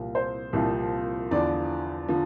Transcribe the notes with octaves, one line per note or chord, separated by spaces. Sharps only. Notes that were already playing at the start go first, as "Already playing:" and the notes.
Already playing: C2 A#2 F3
C5
C2 A#2 F3
E2 D3 F3 D5
D3 F3